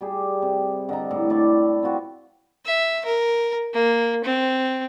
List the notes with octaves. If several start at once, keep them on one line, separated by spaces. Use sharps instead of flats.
G3 G4 G#4
C3
D3 D#5 A#5
A2
D4 E4 D5 C#6
C4 F4 F#4 B4
E5
A#4
A#3
C4